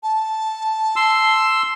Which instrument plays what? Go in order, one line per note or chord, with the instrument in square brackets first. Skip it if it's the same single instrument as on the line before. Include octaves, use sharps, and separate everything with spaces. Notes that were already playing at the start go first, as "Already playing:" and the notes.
[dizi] A5
[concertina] C6 E6